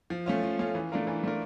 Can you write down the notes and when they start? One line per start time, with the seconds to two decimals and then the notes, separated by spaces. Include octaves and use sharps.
0.10 F3
0.26 A3 C#4 F4
0.43 F3
0.59 A3 C#4 F4
0.75 E3
0.92 A3 D4 F4 A#4
1.07 E3
1.24 A3 D4 F4 A#4